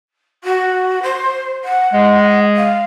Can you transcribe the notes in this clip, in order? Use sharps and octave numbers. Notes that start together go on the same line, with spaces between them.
F#4
C5
F#5
G#3
F5